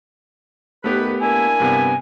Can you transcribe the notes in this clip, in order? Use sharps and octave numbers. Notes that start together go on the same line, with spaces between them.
D#2 A3 B3 G4 B4
A#3 D4 E4 G#5
G2 C3 B3